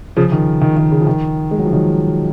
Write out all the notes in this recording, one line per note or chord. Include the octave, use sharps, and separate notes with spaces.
C#3 F3
D#3
D#3
D#3
C#3
F3
D#3
G#3
F#3
F3
D#3 F#3